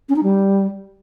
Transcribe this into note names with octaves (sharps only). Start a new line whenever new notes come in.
C#4
D#4
G3